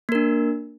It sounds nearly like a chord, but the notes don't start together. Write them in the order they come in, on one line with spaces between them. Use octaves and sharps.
A#3 A#4 D4